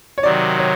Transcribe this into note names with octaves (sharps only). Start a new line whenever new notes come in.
C#5
C3 D#3 F#3 D5
C#5